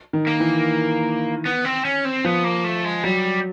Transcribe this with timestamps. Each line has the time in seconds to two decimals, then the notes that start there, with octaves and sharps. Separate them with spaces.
0.13 D#3
0.27 A#3
0.40 E3
1.46 B3
1.65 C4
1.85 C#4
2.05 C4
2.25 F3 B3
2.44 A#3
2.64 A3
2.85 G#3
3.03 F#3 G3